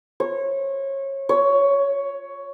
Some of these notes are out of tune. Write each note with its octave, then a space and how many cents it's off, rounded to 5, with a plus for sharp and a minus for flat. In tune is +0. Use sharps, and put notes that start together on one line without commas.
C#5 -25
C#5 +10